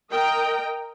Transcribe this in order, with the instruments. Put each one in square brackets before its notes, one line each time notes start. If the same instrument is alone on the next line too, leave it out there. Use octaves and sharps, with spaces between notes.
[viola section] A#4 D#5 G5 A#5